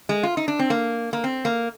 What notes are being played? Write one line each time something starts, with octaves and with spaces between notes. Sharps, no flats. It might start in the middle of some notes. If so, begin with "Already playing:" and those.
G#3
F4
D#4
D4
C4
A#3
A#3
C4
A#3